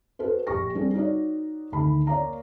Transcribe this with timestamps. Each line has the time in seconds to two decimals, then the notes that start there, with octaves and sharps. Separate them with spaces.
0.19 F#4 A4 B4 C5
0.47 A#1 G4 C#6 A#6
0.75 G3 C4 D4 G#4
0.94 D#4 F#4 C#5 D5
1.72 D2 D#3 A5 B5
2.07 A#3 C#5 D5 F5 A#5